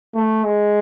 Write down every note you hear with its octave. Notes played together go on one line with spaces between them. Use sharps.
A3
G#3